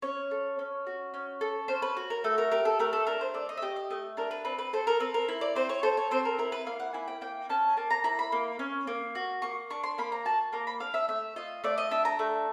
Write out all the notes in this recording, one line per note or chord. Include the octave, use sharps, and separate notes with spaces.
C#4 C#5
A4
C#4
F#4
C#4
A4
C#4 C5
B4
F#4
A#4
A3 A4
A#4
G4 A#4
A4
A3 A#4
A4
D4 A#4
C5
A3 D5
D#5
E5
G4 D#5
D#5
A3 D#5
D4 A#4
B4
C4 B4
B4
A4 C5
A#4
C4 B4
A#4
E4
D5
C4 C5
C#5
A4 C5
C#5
C4 C5
A#4
E4 A#4
B4
A#3 F5
F#5
E4 G#5
G5
A#3 G5
C#4 A5
A#3 A5
A#5
E4 A#5
B5
A#3
C#4
A#3
F#4
A#3 C#6
D4 C#6
C6
A#3 B5
A#5
F#4 A5
A#3 A#5
B5
D4 F5
E5
A3 E5
F4 D#5
A3 D5
D#5
D4 E5
A#5
A3